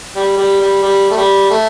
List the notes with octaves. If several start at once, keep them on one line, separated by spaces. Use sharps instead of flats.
G3
G3
G3
G3
A3
G3
A3